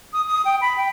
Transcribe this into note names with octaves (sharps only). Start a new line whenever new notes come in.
D#6
D#6
G5
B5
G5